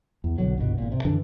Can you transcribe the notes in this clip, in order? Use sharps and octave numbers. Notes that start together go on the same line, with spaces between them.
E2
B1 D3 F#3
G1 C2 B2
G#1 A#2
C3
F#2 D3 E3 D4